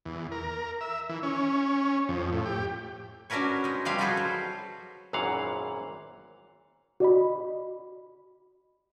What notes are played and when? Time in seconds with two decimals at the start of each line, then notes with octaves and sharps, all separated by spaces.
0.05 E2
0.32 A#4
0.81 E5
1.09 E3
1.23 C#4
2.09 F2
2.32 A2
2.46 G4
3.30 C#4 D4 F#4 A#4 B4 C#5
3.64 G#3 D#4
3.85 F3 G3 B4 F5
3.99 F4 F#4 G#4 A4 B4 C5
4.17 F#3
5.13 G#1 F#2 A#2 E3 F5 F#5
7.00 F#4 D5 D#5 B5